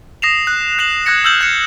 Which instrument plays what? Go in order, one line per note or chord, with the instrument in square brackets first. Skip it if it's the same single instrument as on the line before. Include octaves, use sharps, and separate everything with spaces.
[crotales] D#6 A#6 C7 E7 F7
F#6
F#6 C7 E7 F#7
D#6 F#6 G#6 A#6 C#7
E6 F6 G6 F#7
F#6 G#6 C#7